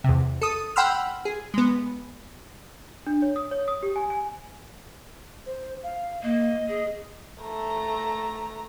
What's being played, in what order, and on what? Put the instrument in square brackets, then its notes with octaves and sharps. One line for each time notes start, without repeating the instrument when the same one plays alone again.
[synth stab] E2 C3
A4 D#6
F#5 G5 B5 C6 E6 F6
G#4
G#3 B3
[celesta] D4
C#5
D#6
C#5
D#6
G4
G#5
G#5
[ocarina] C5
F5
[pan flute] A#3 [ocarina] D#5
[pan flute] G#4
[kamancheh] A3 A#5